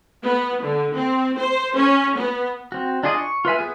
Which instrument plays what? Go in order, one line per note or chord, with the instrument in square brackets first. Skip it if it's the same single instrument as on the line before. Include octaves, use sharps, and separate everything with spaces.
[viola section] B3
D3
C4
C5
C#4
B3
[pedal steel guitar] C4 F#4
D4 F4 G#4 D5 D#5
C#6
F4 B4 E5 G#5
B3 G#4 B4